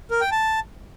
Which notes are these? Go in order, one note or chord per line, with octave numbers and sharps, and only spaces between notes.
A#4
G5
A5